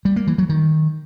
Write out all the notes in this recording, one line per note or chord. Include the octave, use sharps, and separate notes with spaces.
G3
A#3
E3
F#3
D#3